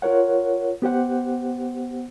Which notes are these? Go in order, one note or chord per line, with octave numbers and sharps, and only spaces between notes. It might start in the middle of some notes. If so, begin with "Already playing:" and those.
F4 A#4 C#5 F#5
B3 G4 C5 F#5